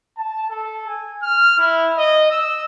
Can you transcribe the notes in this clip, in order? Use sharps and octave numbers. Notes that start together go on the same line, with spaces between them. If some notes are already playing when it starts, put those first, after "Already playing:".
A5
A4
G#5
F6
E4
D#5
E6